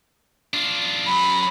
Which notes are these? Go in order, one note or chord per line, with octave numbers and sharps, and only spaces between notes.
D4 F4
F#2 F#3 B5